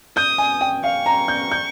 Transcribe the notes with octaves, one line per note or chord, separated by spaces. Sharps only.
D#6 G6
G#5
G5
F5 C#6
A#5
G6
G6